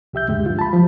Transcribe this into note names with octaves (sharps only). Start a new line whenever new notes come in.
C2 G4 E5 G6
D2 G2 G#3 G4
G2 F4
A5 B5
F3